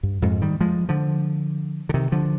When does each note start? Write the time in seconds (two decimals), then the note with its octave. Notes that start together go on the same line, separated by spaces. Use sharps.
0.03 G2
0.22 F2 G#2
0.42 D#3 G3
0.61 F3 G#3
0.89 D3 F3
1.89 D3
1.94 C3 D#3
2.12 D3 F3